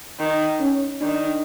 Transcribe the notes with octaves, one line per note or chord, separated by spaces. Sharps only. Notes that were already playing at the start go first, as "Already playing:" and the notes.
D#3
C#4
D#3 D4